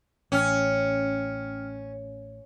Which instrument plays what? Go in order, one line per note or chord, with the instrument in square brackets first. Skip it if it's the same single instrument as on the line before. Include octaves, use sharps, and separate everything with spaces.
[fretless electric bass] A1 [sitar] C#4 [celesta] G5 F6